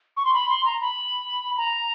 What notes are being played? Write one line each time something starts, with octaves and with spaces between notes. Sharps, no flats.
C#6
C6
B5
C6
A#5
B5
A#5